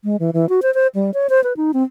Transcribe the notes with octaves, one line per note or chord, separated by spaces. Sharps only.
G#3
E3
E3
F#4
C5
C5
G3
C#5
C5
B4
D#4
C4